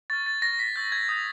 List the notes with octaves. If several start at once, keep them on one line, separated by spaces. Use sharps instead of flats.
C#6 F6 A6
A6
C#6 F6 A#6
B6
C#6 E6 G6 A6
G#6
D#6 G6